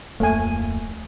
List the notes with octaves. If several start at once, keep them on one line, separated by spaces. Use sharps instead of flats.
D1 F2 A3 A#3 G#5